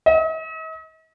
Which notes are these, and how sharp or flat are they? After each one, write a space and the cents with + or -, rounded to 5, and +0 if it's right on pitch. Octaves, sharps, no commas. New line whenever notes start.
D#5 +45